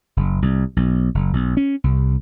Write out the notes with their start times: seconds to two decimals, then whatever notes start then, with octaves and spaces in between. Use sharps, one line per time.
0.17 F#1
0.42 C2
0.76 B1
1.15 F#1
1.33 B1
1.57 C#4
1.84 C2